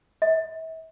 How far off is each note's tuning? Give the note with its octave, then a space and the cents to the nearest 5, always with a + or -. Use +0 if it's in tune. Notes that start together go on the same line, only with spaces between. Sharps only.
E5 -40